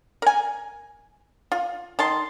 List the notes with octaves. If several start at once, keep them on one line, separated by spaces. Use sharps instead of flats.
A#4 G#5
F4
D#3 A5 C6